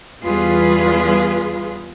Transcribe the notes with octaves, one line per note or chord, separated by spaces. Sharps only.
E2 G3 F4 G#4 B4